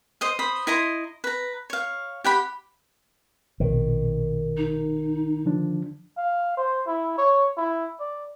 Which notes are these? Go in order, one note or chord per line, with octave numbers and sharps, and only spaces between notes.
C5 D#5 D#6
C5 B5 D#6
E4 D#5 A#5 C6
B4 A#5
C#5 F5
G4 F#5 B5
A#1 B2 D#3
D#4
D3 F3 D4
F5
C5
E4
C#5
E4
D5